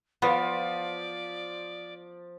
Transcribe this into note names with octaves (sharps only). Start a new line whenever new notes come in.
F3 B3 D5